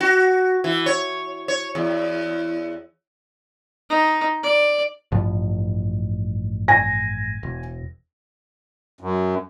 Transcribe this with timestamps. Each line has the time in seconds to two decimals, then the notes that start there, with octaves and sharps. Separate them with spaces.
0.01 F#4
0.64 E3
0.86 C#5
1.48 C#5
1.75 E2
3.90 D#4
4.43 D5
5.12 A1 G2 F3
6.68 G#5 A#6
7.43 E1
9.01 F#2